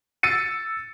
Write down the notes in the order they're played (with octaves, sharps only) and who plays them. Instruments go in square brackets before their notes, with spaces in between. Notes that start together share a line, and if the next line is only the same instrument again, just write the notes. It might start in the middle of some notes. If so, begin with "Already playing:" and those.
[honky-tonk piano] E6 A6 C#7 D#7